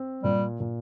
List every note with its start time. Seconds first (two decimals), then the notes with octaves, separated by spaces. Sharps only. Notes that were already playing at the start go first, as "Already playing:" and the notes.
Already playing: C4
0.23 A#2 G3
0.60 A#2